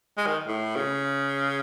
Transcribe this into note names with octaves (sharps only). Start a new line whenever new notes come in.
G#3
D#3
A2
C#3